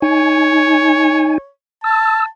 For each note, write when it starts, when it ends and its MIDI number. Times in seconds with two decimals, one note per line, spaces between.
0.02 1.38 63
0.02 1.49 73
0.02 1.38 80
1.84 2.26 81
1.84 2.26 88